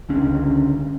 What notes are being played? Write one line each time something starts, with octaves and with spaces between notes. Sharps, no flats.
C#2 D3 C#4